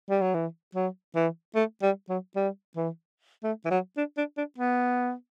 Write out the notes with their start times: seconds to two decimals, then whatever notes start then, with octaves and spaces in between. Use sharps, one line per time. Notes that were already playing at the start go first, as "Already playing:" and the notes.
0.10 G3
0.21 F#3
0.34 E3
0.75 F#3
1.15 E3
1.55 A3
1.82 G3
2.09 F#3
2.36 G3
2.77 E3
3.44 A3
3.65 E3
3.71 F#3
3.97 D4
4.18 D4
4.37 D4
4.58 B3